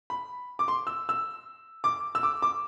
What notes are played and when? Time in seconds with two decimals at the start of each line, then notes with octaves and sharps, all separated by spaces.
0.10 B5
0.59 D6
0.68 C6
0.87 E6
1.09 E6
1.84 D6
2.15 E6
2.23 D6
2.42 D6